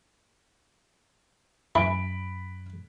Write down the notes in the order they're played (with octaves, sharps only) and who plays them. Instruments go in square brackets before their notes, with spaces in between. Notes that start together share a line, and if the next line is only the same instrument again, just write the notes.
[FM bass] F#2 [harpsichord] E3 [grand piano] B5 D7